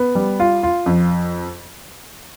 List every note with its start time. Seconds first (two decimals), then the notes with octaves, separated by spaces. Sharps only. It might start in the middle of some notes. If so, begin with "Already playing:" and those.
Already playing: B3
0.15 G3
0.40 F4
0.63 F4
0.86 F2